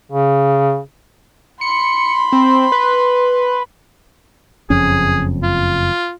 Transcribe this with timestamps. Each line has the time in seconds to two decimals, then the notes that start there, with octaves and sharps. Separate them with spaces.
0.12 C#3
1.61 B5 C6 C#7
2.33 C4
2.72 B4
4.70 F#1 F2 C#4 G#4
5.43 F4